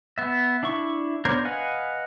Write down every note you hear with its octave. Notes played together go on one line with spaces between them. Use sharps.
B3 E5
D4 E4 E5 C#6
B3 D4 A#4 C5 C#5
B4 D#5 F5 F#5 G#5